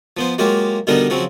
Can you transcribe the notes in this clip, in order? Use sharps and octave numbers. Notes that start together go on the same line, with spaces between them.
F3 B3 C5
F#3 G#3 A#3 F4 G4
B2 D3 G3 B3 D#4 A#4
C#3 F3 F#3 C4